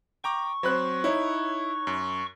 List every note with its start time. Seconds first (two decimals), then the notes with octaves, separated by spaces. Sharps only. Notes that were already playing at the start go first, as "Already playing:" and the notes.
0.24 G5 A#5 C#6 D6
0.63 F#3 C4 C5 B5 F#6
1.04 D#4 E4 C#5
1.87 F#2